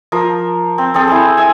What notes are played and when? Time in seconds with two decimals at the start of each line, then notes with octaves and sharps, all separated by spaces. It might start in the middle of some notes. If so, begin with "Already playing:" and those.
0.12 F3 A#4
0.78 C4
0.94 C4 G#4 A4
1.08 C4 E4
1.37 E5 G#5